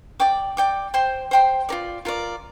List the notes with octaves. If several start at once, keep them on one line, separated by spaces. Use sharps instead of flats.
D5 G5 D6
D5 G5 D6
C5 G5 C6
C5 G5 C6
F4 A#4 D5
F4 A#4 D5